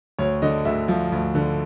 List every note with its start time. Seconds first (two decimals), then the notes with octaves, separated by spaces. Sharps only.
0.19 D2 C#5
0.42 D3 D#5
0.65 D2 E5
0.88 F3
1.12 D2
1.35 D3